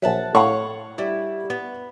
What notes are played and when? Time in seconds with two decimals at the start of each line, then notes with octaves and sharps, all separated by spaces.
0.02 A#1 F#3 E5 F#5 A5
0.35 A2 C#5 F5 F#5 C#6
0.98 G3 E4
1.50 B3